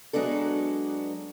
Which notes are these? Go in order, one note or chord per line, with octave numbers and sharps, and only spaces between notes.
F#3 G#3 B3 D4 A4